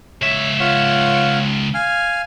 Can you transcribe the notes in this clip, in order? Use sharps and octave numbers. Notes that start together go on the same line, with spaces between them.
C#2 C#5 E5
F4 C#5 F#5
F5 G#5 F6